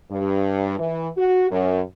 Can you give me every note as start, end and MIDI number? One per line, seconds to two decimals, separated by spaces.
0.11 0.77 43
0.79 1.08 52
1.17 1.48 66
1.51 1.81 42